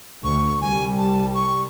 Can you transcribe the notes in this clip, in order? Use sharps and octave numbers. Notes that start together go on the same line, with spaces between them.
D2 C#6
C2 G3 G#5
A5
C#6